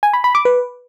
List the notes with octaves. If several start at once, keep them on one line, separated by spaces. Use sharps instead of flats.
G#5
B5
B5
D6
B4